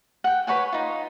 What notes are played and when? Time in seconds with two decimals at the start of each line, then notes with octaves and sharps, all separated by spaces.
0.24 F#5 G5
0.47 B4 C#5 F#5 G#5
0.72 D#4 F4